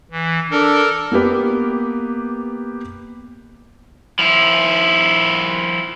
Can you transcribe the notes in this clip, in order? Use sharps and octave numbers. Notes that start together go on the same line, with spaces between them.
E3
D4 A4 A#4
A#3 B3 G4 B4
F3 E4